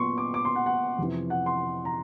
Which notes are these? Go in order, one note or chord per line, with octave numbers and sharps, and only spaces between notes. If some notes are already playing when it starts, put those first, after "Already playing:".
Already playing: A#2 F#3 B3 C6 C#6
D6
D6
C6
F#5
F#5
F2 C3 E3
F#5
C6
A#5